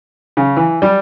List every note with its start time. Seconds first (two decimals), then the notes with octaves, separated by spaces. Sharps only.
0.37 C#3
0.57 E3
0.82 G3